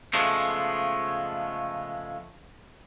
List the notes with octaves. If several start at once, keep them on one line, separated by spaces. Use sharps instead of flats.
C#3 F3 G#3 A3 B3